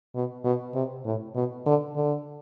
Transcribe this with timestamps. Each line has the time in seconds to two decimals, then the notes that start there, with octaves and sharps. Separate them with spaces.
0.15 B2
0.44 B2
0.74 C3
1.05 A2
1.35 B2
1.66 D3
1.96 D3